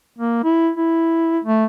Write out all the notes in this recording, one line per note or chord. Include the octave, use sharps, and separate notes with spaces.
A#3
E4
E4
A3